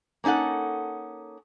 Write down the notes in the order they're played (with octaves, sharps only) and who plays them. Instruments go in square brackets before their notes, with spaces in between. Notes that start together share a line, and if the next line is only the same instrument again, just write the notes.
[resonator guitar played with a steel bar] A#3 C#4 D#4 A4 F#5